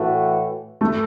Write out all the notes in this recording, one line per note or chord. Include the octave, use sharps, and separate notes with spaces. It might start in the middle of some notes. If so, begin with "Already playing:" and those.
Already playing: A2 E3 A3 F#4
A3